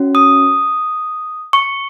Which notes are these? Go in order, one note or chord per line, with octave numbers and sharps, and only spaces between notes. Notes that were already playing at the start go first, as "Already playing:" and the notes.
Already playing: C#4 F#4
D#6
C#6